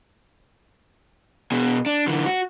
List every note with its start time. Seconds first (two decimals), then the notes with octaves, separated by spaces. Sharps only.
1.52 B2 G#4
1.86 D4
2.07 D3 E3
2.26 F#4